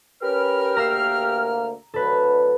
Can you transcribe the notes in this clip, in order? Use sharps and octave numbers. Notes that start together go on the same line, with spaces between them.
C#4 G4 A#4 B4 F6
D2 A#3 A#5 E6 C7
D2 D3 F#3 A4 B4